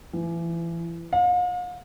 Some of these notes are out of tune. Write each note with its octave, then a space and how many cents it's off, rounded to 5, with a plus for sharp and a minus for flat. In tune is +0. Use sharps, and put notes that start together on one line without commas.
E3 +30
F5 +45